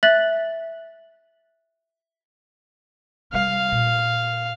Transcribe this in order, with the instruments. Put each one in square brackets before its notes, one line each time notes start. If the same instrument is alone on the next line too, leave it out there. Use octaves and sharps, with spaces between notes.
[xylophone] E5 F#6 A6 F#7
[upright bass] C3 G3 [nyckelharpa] F5
[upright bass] A#2